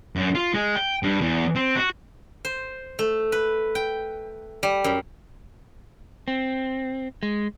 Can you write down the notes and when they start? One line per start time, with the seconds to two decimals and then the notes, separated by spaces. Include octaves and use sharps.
0.16 F#2
0.35 F4
0.54 G#3
0.75 G5
1.03 G2
1.21 E2
1.56 C4
1.76 F#4
2.45 C5
2.99 A3
3.32 B4
3.75 G5
4.63 G3
4.84 F#2
6.28 C4
7.23 G#3